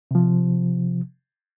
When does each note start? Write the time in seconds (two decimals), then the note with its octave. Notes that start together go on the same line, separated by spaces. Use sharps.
0.11 C3 F3